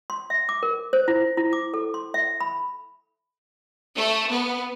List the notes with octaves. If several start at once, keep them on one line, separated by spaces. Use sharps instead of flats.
C6
E5
D6
A#4
C5
E4
E4
D6
A4
C6
E5
B5
A3
B3